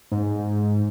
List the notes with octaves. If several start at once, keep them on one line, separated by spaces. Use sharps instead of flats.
G#2